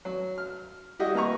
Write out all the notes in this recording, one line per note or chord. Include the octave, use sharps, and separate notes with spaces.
F#3
F6
G3 E4 F#4 G4 D#5 E5
A#3 B4 A#5 C#6